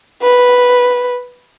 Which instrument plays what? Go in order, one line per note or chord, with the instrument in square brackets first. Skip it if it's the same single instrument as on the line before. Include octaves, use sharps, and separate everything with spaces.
[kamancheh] B4